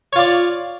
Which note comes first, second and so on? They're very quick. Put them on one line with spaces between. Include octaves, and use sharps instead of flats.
C#5 F4 D5